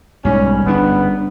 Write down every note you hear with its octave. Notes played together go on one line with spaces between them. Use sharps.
B1 G#2 G3 C#4
G1 C#3 B3 D4